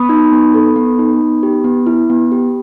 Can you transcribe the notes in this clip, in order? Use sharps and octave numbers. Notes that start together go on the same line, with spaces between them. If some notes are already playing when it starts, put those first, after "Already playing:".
Already playing: B3 B5 D#6
D#4
B3
A4
B3
D#4
B3
G4
B3
E4
B3
G4